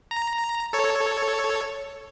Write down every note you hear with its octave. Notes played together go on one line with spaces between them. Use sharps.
A#5
A4 C#5